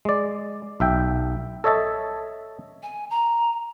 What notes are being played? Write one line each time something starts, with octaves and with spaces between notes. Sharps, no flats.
G#3 D5
B1 E5 G5
A4 C#5 D#5 E5 A5
G#5
A#5